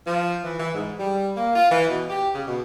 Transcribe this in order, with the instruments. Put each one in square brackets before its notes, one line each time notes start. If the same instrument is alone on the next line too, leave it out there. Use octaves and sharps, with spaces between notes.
[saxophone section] F3
E3
E3
G#2
G3
A#3
F4
E3
B2
G4
C#3
B2